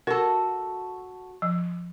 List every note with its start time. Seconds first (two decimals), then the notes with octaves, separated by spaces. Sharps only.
0.07 F#4 A4 A#4
1.42 F3